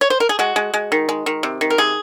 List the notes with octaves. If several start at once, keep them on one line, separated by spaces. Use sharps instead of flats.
C#5
C5
A#4
G#4
G#3 F#4
G#3
G#3
D#3
G#3
D#3
C3
D#3
A#4
C3 G#4